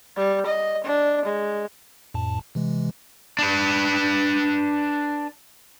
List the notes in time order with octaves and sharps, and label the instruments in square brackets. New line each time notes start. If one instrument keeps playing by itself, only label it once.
[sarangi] G3
D#5
D4
G#3
[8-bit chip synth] F2 A2 A5
C3 E3 G#3
[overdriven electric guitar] D4 B4